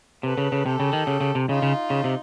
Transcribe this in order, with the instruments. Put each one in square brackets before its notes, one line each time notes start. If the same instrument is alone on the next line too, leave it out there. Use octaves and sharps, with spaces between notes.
[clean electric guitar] C3 [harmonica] A4 B4
[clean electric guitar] C#3
C#3
[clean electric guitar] C3 [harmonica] G4 A4
[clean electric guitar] C#3
D#3
C#3
C#3
C3
[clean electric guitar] C#3 [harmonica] D#4 F4
[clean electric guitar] C#3
C#3
C3